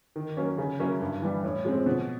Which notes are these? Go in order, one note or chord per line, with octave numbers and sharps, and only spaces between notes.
D#3
F#3 A#3 C#4
C#3
F#3 A#3 C#4 E4
G2
E3 G3
A2
F3 G#3 C4
B2